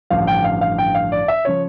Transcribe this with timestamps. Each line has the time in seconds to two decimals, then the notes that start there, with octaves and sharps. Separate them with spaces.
0.10 A1 G2 D3 F3 F5
0.27 G5
0.44 F5
0.61 F5
0.78 G5
0.95 F5
1.12 D5
1.28 E5
1.45 C#3 F3 C#5